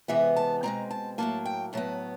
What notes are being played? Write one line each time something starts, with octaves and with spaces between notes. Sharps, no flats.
C3 E3 G#3 B3 E5
A5
B2 G#3 C4 A#5
A5
A2 F#3 A#3 A5
G5
A2 F#3 B3 A5